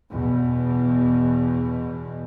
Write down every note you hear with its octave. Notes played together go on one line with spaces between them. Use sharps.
E2 B2